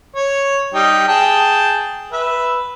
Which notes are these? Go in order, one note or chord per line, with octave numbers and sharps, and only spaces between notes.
C#5
G3 D#4 G5
G#4 G5 A5
B4 E5